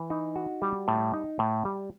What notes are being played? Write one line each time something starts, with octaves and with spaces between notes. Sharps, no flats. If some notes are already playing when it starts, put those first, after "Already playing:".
Already playing: E3
D#4
F#4
G3
A2
D#4
A2
G3